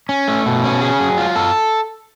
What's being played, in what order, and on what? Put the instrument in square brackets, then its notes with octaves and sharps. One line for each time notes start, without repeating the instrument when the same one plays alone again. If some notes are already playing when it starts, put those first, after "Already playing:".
[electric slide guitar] C#4
A3
B2
C#4
G#4
F#3
F4
A4